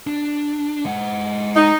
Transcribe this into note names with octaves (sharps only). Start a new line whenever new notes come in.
D4
G#3 F#5
D#4